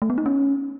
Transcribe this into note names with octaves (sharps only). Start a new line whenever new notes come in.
A3
B3
D#4
C#4